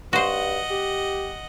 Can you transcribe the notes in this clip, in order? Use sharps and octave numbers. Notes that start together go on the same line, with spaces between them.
G2 F#4 C5 D#5 F#5
G4